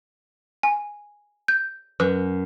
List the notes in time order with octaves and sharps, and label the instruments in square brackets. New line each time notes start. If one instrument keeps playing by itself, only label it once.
[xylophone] G#5
G6
[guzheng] F#2 [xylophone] B4